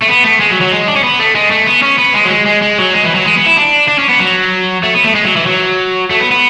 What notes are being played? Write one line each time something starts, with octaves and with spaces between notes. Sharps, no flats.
A3
B3
A3
G#3
F#3
F#3
G#3
D4
C#4
B3
A3
G#3
A3
B3
C#4
B3
G#3
F#3
G#3
G#3
G#3
F#3
G#3
E3
F#3
G#3
B3
E4
D4
D4
C#4
B3
F#3
A3
B3
A3
G#3
F#3
E3
F#3
A3
B3
B3